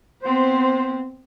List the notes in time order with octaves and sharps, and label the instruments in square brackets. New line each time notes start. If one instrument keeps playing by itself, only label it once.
[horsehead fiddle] B3 C4 [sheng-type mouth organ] C5